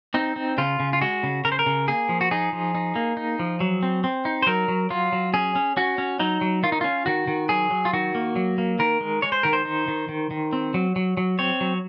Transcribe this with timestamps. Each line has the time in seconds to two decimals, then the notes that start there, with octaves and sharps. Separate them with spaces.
0.14 C4 D#4
0.36 C4
0.58 C#3 F4
0.80 C#3
0.93 F4
1.01 G#3 F#4
1.23 C#3
1.45 C#3 A#4
1.52 C5
1.59 A#4
1.66 C#3
1.88 A#3 G#4
2.09 F3
2.21 F#4
2.31 D#4 G#4
2.53 F3
2.75 D#4
2.96 A#3
3.17 D#4
3.39 F3
3.60 F#3
3.83 C4
4.04 C4
4.25 D#4
4.42 C5
4.47 F#3 A#4
4.68 F#3
4.90 F#3 F4
5.12 F#3
5.34 C#4 G#4
5.55 C#4
5.77 C#4 F#4
5.98 C#4
6.20 F#3 D#4
6.41 F#3
6.63 D#3 F4
6.72 D#4
6.81 C#4 F4
7.06 D#3 F#4
7.27 D#3
7.49 F#3 G#4
7.71 F#3
7.85 F4
7.93 D#3 F#4
8.15 A#3
8.36 F#3
8.58 A#3
8.79 D#3 A#4
9.01 G#3
9.22 G#3 C#5
9.32 C5
9.43 D#3 A#4
9.53 C5
9.65 D#4
9.88 D#3
10.09 D#3
10.31 D#3
10.53 C4
10.74 F#3
10.96 F#3
11.17 F#3
11.39 C4 C#5
11.61 F#3